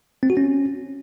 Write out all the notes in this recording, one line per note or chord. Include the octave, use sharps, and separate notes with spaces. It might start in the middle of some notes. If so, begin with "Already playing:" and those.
C4
F#4
C#4